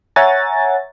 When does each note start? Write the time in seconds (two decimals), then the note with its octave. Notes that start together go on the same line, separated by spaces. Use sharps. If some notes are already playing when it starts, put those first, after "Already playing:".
0.16 C#5 E5 F#5 G#5 A#5 A6